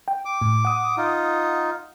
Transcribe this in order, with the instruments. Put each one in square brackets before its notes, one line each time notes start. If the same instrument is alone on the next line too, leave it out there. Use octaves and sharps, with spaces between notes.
[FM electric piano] G5
[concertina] D6
[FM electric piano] A2
F#5 D#6
[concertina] D#4 F4